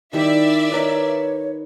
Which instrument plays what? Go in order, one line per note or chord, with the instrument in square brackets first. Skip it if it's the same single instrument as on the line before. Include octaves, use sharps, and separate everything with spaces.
[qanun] D#3 G3 E4 [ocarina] D#4 [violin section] D5 E5
[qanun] D#4 A#4 B4 [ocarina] C#5